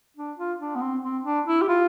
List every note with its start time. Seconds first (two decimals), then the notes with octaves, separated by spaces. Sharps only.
0.17 D4
0.37 F4
0.60 D4
0.75 B3
0.81 C4
1.03 C4
1.25 D4
1.46 E4
1.62 G4
1.68 F4